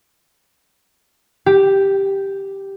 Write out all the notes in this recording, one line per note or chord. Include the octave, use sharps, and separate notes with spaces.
G4